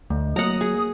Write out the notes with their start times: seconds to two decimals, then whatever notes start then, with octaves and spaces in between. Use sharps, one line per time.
0.10 D2 A3
0.36 F#3 A#3 F#5 A#5 D#6
0.61 G#4